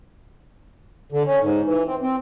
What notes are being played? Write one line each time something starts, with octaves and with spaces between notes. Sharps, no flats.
D3
C#4
G#2
E3
C4
C4